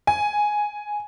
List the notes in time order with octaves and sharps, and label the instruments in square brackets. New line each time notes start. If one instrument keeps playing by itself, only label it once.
[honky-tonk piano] G#5